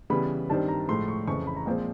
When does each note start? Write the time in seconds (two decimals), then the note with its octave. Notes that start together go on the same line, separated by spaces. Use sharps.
0.10 C#3 E3 G3 B3 B5
0.50 G2 D#3 G3 C4 A5
0.68 A#5
0.88 A2 F3 G#3 C6
1.08 C#6
1.27 F2 C#3 E3 C#6
1.47 B5
1.56 A#5
1.66 A#2 F3 G#3 C4 F5